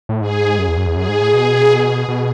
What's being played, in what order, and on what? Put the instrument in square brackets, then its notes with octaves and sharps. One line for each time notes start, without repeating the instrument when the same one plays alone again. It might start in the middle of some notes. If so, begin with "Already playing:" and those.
[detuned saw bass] A2
[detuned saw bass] G#2 [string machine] G#4
[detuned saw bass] F#2
E2
F#2
E2
[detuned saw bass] F#2 [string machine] G#4
[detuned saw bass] G#2
A2
B2
B2